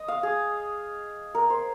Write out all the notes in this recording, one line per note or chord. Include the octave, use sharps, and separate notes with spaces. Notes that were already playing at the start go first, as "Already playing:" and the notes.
Already playing: D#5
F5
G#4
A#4
C5